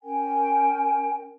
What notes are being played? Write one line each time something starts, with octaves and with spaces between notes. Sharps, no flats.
C#4 A#4 G5 G#5